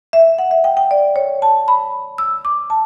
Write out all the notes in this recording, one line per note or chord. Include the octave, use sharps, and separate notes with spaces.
E5
F#5
E5
G5
G5
D5
C#5
A5
B5
E6
D6
A5